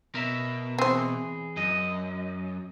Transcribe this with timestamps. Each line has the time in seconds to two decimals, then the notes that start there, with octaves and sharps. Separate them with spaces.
0.15 B2 A#4 E5
0.78 E3 C4 G#4 C5
1.57 F#2 D#5